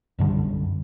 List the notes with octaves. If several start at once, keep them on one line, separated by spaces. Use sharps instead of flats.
B1 F#2 D3 G3